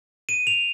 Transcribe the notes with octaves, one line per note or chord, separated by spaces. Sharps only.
D#7
F7